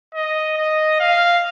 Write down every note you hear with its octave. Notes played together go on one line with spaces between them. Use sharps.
D#5
D#5
F5